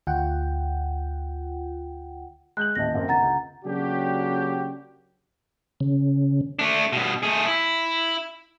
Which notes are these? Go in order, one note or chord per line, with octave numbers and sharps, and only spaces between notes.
D2 F4 F#5 G5
G#3 F#6 G6 F#7
D#1 A1 D#5 A5 A#6
F#2 C4 A#4
C2 D3 F#5 A#5 A6
C#2
C#3 F#3 A#3 D4 F#4 G4
C#3
A3 D4
G2 B2
A3 G#4
E4